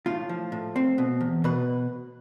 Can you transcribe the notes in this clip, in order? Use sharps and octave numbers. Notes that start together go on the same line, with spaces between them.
A2 F4
F3
A2
C4
B2
E2
B2 B4